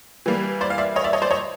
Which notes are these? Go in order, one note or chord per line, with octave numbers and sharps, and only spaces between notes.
E3 G3 A#3
C5 D5
F5
D5 E5
C#5 D#5
D5 E5
C#5 D#5
C5 D5
C#5 D#5